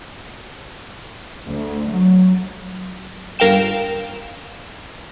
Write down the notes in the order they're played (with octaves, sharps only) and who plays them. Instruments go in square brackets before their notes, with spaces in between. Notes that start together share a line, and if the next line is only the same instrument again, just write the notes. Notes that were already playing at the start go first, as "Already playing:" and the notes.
[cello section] D2
F#3
[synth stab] G1 A#4 F5 G5 E7